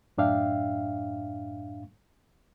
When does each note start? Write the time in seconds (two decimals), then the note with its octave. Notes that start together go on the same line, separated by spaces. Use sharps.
0.18 F#2 A2 D4 E5 F5 G5